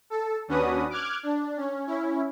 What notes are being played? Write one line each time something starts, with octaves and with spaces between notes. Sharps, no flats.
A4
D#2 C#4 D4 F#4 B4 D#6
D6 F6 F#6 G#6
D4
C#4
C#4 E4